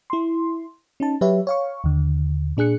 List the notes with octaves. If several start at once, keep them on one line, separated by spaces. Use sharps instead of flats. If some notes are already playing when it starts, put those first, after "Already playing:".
E4 C6
C#4 D#4 A5
F#3 G4 B4 C#5 E5
C#5 F5 C#6
D#2 D3
A#2 D4 G#4 F#6 C#7